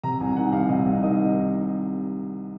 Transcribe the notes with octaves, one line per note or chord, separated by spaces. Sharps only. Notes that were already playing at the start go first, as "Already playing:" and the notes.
C3 A#5
C2 G#5
D#3 F#5
C2 F5
C3 D#5
C2
D#3 D#5